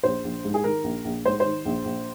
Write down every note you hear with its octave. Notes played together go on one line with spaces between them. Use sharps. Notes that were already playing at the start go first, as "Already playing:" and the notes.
A#1 C5
A#1
G#2
G#4
D#3 A#4
A#1
A#1
G#2 C5
D#3 C5
A#1
A#1